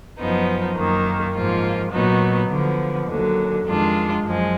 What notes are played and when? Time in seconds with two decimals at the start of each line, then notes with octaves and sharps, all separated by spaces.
0.18 F#2 F3 B3 D#4
0.76 F#2 D#3 A#3
1.34 G#2 F3 A#3 F4
1.91 A#2 F#3 B3 D#4
2.50 D3 F3 B3
3.07 D#2 D3 F#3
3.65 F2 D#3 G#3 D4 F4
4.23 F#2 F3 G#3